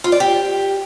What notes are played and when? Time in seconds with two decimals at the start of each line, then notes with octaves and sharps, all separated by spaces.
0.04 F4
0.12 D5
0.20 G4